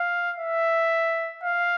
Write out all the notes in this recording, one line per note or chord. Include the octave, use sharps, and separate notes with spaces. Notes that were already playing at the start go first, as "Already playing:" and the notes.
Already playing: F5
E5
F5